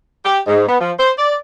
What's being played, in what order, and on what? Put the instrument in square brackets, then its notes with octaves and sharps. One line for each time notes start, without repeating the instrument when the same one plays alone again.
[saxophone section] G4
G#2
B3
F3
C5
D5